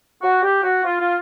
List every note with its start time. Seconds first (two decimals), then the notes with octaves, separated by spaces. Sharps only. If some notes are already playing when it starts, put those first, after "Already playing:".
0.22 F#4
0.42 G4
0.63 F#4
0.84 F4
0.99 F4